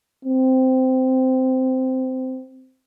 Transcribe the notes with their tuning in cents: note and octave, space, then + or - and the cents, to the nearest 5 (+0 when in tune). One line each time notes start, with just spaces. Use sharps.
C4 -15